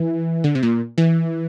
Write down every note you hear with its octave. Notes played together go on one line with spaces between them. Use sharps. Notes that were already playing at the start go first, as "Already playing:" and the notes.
Already playing: E3
D3
C3
A#2
E3